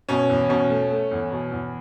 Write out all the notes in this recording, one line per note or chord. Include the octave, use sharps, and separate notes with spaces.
B2 C#4
E2
B2 C#4
A3
A3
E2
B2
E2